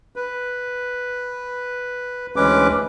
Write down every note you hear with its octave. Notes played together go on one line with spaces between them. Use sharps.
B4
D2 E3 G#3 C#4 B4 D6